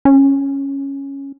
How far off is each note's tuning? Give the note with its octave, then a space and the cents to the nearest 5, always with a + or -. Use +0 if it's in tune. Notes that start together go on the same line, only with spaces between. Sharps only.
C#4 -5